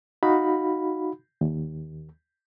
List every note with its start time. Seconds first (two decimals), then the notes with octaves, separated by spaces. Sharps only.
0.23 D#4 F#4 F5 B5
1.41 D#2